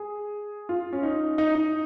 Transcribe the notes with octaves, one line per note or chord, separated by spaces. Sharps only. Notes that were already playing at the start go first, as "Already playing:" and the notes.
Already playing: G#4
F4
C#4
D#4
D#4
D#4